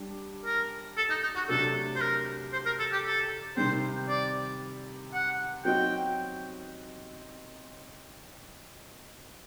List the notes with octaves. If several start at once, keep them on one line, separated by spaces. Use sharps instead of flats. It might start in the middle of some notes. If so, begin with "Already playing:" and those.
Already playing: G3 D4
A#4
A4
D#4
D#4
F#4
C3 F#3 A3 D4 A4
C5
A#4
C5
A#4
A4
G4
A4
C3 D#3 G3 C4 C5
D5
F#5
F#3 C4 D#4 F#4 G5